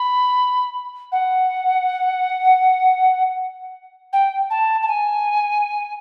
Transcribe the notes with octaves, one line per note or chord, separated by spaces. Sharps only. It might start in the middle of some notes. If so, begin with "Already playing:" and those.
Already playing: B5
F#5
G5
A5
A5
G#5